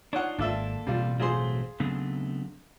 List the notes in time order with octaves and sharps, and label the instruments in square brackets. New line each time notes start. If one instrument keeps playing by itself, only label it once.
[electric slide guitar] D4 D#4 F4 [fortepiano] C#5 F#5
[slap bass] G#1 [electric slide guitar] A#3 A4 [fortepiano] D4 F4 E5
[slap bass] A1 B2 C4 [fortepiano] G3 F4
[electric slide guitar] F#3 A3 C5 [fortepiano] F4 G#4 C6
[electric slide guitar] C#3 A3 B3 [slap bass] F#3 C4 D4